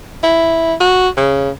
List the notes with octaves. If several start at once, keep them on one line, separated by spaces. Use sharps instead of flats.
E4
F#4
C#3